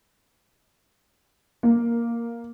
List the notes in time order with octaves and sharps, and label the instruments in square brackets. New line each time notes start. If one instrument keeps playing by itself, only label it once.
[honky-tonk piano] A#3